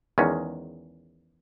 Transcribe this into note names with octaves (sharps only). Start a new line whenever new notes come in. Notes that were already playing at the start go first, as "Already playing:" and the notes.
E2 D#3 G#3 C#4